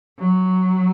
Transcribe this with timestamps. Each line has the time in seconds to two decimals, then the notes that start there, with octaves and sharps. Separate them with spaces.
0.18 F#3